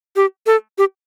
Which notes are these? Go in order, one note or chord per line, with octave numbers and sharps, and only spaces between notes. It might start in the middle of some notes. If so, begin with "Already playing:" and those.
G4
A4
G4